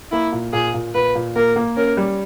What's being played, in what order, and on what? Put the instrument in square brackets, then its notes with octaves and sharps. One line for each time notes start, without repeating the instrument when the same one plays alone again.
[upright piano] A#3 [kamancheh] E4
[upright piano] A#2
[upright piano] A#2 [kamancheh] G#4
[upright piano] A#2
[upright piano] A#2 [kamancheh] B4
[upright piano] A#2
[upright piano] A#3 [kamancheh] A#4
[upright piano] A#3
[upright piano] C#4 [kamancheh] A#4
[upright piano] G3